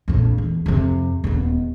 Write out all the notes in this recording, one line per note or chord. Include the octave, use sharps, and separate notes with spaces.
A#1 F2
E2
F2 C3
D#1 B3